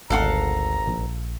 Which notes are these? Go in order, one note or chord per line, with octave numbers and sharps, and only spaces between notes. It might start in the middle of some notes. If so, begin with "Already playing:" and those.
G#1 D2 A4 F5 F#5 A#5
A#1